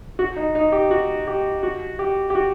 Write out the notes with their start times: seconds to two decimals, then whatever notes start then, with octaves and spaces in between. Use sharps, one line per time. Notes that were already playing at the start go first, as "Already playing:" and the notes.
0.19 F#4
0.36 D#4
0.55 D#4
0.72 G4
0.91 F#4
1.27 G4
1.63 F#4
1.99 G4
2.30 G4
2.35 F#4